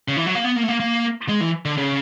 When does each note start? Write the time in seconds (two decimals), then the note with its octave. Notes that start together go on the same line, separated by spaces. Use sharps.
0.08 C#3
0.17 E3
0.26 F#3
0.35 A#3
0.44 B3
0.56 A#3
0.63 A3
0.68 A#3
0.80 A#3
1.29 G#3
1.41 E3
1.65 D3
1.77 C#3